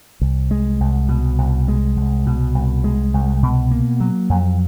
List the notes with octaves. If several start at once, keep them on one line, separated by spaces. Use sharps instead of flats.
C2
G#3
C2
B2
C2
G#3
C2
B2
C2
G#3
C2
B2
A#3
F#3
F2